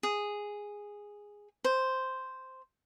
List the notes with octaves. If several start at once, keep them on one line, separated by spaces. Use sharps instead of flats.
G#4
C5